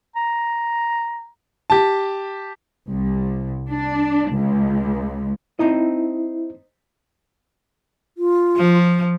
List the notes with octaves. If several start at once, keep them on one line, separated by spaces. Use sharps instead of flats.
A#5
G4 A5
C2
D4
C#2
C4 D#4 E4 D#5
F4
F3